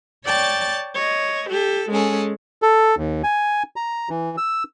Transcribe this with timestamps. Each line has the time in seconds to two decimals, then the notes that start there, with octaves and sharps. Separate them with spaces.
0.25 C#5 D5 G5 A5 A6
0.95 C#5 D#5
1.49 G4 A4
1.90 G#3 C#4 G#4 A4
2.62 A4
2.98 D#2
3.24 G#5
3.76 A#5
4.09 E3
4.38 E6